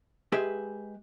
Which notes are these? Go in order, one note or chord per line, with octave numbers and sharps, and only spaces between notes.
G#3 G4 G#4 B4 E5